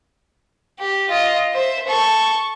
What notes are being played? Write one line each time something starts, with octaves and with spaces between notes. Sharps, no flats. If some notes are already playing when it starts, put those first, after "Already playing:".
G4
F4 D#5
C5 E5
A4 C#6